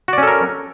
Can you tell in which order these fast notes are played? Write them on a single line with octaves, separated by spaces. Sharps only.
F#4 D5 C#4 A4 A#4